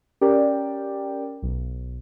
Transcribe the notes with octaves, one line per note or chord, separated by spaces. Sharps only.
C#4 G4 A#4 D5 G5
B1